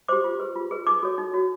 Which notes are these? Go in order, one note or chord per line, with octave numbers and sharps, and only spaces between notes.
G4 C5 D6
F4
G#4 B4
F4
G#4 B4
D#4 D6
F#4 A4 C#5
D#4
F#4 A4 C#5